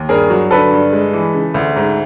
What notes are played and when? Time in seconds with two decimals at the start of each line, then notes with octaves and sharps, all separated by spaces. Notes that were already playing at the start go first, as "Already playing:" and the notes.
Already playing: D#2
0.09 G2 G#4 A#4
0.30 F#3
0.51 D3 A4 B4
0.71 G2
0.93 G#3
1.13 E3
1.35 C#3
1.54 D2
1.76 G#2